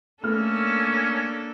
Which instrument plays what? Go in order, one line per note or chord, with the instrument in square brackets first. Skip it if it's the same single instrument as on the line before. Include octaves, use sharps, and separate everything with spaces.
[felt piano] A3 F6 [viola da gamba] A#3 D4 A4 [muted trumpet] C#4